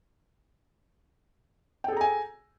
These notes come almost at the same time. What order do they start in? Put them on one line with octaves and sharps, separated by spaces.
G5 A4 G#4 A#5 G#5